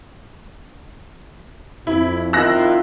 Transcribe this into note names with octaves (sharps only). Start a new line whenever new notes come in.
F2 E4
D#3 E4 F4 E6 F#6 A#6